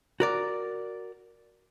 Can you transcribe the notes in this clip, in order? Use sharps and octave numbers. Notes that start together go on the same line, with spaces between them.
F#4 A#4 D5